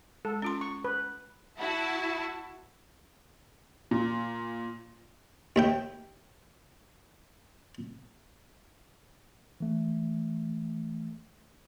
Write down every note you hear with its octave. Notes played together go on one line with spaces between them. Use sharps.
G#3 A4
C#4 F4 C6
C#6
B4
E4 F#4 A5
A#2
D#2 E5 G5
E3 A3